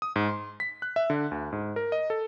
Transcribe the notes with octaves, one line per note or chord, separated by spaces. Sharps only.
D#6
G#2
C6
B6
F#6
E5
D3
D2
G#2
A#4
D#5
A4